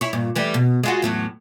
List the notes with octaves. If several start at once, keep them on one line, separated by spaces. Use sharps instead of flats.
E4 C#5
G2 A#2
E3 G3 A3
B2
G#3 F4 F#4
E2 A2 F#3